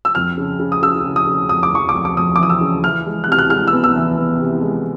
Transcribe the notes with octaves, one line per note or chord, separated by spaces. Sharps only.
E6
F2 F6
C#3
C#3
D#6
C#3 E6
C#3
D#6
C#3
F2 D#6
D6
F2 C#6
D6
F2
D6
F2 D#6
D6
E3 D#6
E6
C#3
E3 F6
G#3
F#6
C3 F6
F#6
G#3 F6
E6
B3
E6
E3
B3
C3
G#3